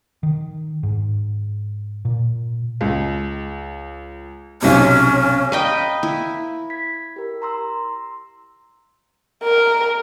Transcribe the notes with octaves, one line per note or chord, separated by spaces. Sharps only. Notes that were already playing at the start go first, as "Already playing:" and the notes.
D#3
G#2
A#2
C#2
B1 C3 C#4
B4 D#5 F5 G5 A#5
E4
G#6 B6
G4 A#4
A#5 C6 E6
A#4